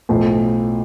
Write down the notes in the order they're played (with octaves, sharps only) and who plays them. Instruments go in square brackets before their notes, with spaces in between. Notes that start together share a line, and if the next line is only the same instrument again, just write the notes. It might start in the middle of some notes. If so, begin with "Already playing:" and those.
[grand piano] B1 A2 F3